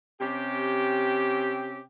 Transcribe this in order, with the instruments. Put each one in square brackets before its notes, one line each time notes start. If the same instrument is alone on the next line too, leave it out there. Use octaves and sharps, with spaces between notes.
[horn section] C3 C#4 G4